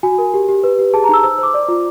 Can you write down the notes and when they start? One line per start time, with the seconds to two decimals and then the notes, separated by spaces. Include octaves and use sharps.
0.03 F#4 G#5
0.18 A#4
0.34 G4
0.48 G4
0.64 B4
0.79 G4
0.94 G#4 A5
1.04 A#5
1.09 D#4 E6
1.24 C5 E6
1.38 C5 D6
1.54 D5
1.68 F4